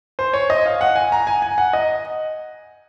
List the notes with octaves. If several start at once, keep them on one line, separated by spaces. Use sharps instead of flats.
C5
C#5
D#5
F5
F#5
G#5
A#5
G#5
G#5
F#5
D#5